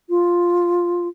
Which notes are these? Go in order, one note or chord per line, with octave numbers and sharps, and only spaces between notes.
F4